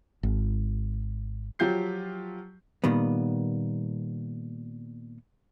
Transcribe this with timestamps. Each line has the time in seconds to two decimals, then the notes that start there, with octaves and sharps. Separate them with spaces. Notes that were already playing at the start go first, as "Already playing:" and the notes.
0.23 G#1
1.59 F3 F#3 F4 G4 G6 C7
2.84 A#2 D#3 G3 B3